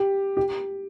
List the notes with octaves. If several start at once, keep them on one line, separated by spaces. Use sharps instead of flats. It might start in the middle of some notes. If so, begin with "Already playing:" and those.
Already playing: G4
G4